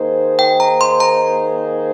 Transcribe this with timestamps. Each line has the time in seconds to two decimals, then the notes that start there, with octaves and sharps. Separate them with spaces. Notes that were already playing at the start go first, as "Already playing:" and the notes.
Already playing: D#3 A#3 D#4 G#4 C5
0.39 G5
0.60 A#5
0.81 C6
1.00 A#5